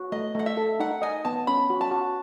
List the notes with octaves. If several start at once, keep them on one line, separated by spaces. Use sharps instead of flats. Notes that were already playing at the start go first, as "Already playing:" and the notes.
Already playing: F#4
A3 D#5
A3 F#5
E5
A4
D#4 F#5
D#5 G#5
B3 A5
C#4 B5
F#4
A5
F#4